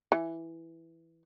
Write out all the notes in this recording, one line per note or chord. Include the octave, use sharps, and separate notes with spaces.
E3